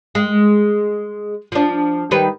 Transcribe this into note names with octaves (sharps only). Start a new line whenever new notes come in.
G#3
F3 D4
D#3 G3 B4